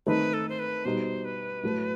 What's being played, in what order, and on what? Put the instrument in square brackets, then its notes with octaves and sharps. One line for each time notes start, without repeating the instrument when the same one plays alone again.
[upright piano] D#3 A3 C4 D#4 [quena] B4
[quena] A4
C5
B4
[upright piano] B2 G3 D#4 [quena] C5
[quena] B4
[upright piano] A2 F#3 A3